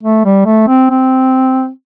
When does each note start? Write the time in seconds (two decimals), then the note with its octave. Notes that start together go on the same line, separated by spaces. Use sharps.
0.03 A3
0.25 G3
0.46 A3
0.68 C4
0.91 C4